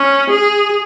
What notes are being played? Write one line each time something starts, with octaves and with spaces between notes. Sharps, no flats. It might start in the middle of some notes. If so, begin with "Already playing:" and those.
Already playing: C#4
G#4